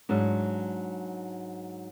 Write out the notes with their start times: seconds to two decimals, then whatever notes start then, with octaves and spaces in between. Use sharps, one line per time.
0.09 G#2 F#3 D4